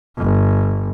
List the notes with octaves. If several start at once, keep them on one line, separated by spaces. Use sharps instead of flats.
G1